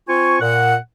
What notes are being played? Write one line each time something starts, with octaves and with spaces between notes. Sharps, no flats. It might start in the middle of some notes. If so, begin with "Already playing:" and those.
C4 F4 G#5 C#6
A#2 F#5